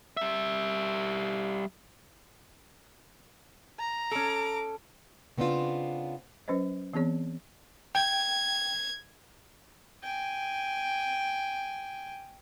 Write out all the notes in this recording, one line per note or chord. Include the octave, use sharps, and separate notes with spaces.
G3 E5
A#5
C#4 A4 D6
C#3 B3 C4 D4 F4
F#3 C#4 B4 C5 D#5
E3 B3 C4 G#4 C#5
G5 G#6
G5 G#5